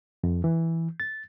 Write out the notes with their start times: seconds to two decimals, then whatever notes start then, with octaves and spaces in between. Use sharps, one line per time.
0.24 F2
0.44 E3
1.00 A6